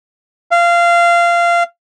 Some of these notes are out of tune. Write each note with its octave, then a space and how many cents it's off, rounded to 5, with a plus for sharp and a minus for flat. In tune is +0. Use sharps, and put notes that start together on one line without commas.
F5 -20